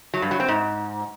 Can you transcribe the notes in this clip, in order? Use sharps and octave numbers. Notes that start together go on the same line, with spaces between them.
F#3
G2
F#3
C4
G#2